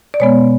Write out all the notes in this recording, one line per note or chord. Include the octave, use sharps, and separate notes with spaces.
D5
B2 G#3 B3 C#5